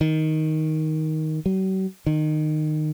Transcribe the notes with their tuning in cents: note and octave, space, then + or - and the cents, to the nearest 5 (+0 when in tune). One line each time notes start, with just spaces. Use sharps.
D#3 +10
F#3 +45
D#3 -20